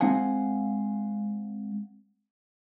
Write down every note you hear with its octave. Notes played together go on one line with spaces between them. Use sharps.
G#3 C4 F5 F#5 G#5